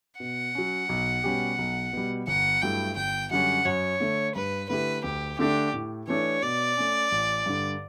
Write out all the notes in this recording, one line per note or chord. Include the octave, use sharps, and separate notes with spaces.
B2 F#5
F#3 C#4
B1
B2 G3 C#4 G4
B1
B2 G3
G1 F#5
G2 F#3 A3 E4 G5
G1 G5
F#2 D3 G3 C#4 F#5
F#2 C#5
D3 A3
G2 B4
D3 A3 E4 G4 B4
D2 G4
D3 A3 D4 G4
A2
E3 A3 D4 A4 C#5
B2 D5
A3 C#4
A1
G2 D3